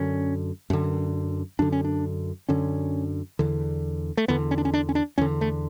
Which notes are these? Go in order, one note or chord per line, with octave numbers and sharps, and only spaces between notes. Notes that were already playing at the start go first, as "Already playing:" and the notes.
Already playing: F#2 D3 C#4
F#2 D3
F#2 D3 D4
C#4
D4
F#2 D3 C#4
E2 D3
A3
E2 D3 B3
C#4
D4
C#4
D4
C#4
D4
E2 D3 C#4
A3